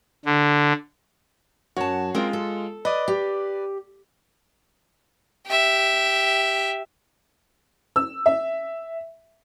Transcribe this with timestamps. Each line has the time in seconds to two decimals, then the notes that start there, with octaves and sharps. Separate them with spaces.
0.25 D3
1.76 F#2 F#4 C#5 A5
2.15 G#3 C4 F4 A#4
2.33 A4
2.85 B4 D5 D#5
3.08 G4
5.46 G4 E5
7.96 E6
8.26 E5